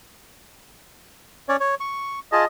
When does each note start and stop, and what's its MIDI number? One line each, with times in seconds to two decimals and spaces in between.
1.49 1.56 61
1.49 1.56 73
1.49 1.56 74
1.60 1.75 73
1.80 2.20 85
2.32 2.45 65
2.32 2.45 68
2.32 2.44 75
2.32 2.45 81